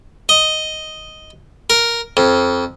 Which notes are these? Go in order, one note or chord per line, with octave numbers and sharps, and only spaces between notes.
D#5
A#4
F2